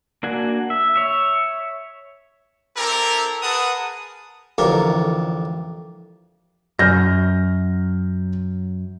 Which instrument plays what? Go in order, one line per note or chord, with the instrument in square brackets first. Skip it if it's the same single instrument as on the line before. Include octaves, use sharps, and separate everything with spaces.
[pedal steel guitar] A#3 D4 F#4 G#5
E5
C#5 E5
[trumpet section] C4 E4 G4 A4 A#4
G#4 A#4 B4 F#5 A5 D#6
[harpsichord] A1 F2 D3 A#4 C#5
[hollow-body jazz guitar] F#2 [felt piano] F6 G6 A#6